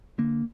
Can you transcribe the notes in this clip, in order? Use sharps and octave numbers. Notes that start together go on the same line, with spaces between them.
D3 A#3